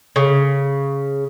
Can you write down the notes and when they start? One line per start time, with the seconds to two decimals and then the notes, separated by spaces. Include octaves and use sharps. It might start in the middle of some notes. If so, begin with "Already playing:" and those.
0.16 C#3